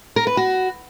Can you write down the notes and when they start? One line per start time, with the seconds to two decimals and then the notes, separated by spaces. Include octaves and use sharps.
0.16 A#4
0.27 B4
0.37 F#4